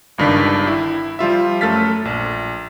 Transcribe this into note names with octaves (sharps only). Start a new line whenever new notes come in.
G1 C#2 G2 D#3 D4 B6
E4
F3 G3 F4 E5
F#2 A3 A4 F6 A6 B6
A#1